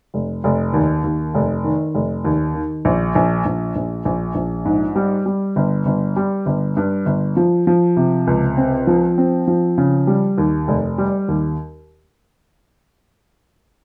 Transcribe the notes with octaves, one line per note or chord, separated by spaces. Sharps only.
F1
F1
D#2
D#2
F1
D#3
F1
D#2
D#3
A#1
A#1
A#1
A#1
A#1
A#1
G#2
G3
G3
G1
G1
G3
G1
G2
G1
F3
F3
C3
C#2
C4
F3
C4
F3
C#3
G3
D#2
F1
G3
D#2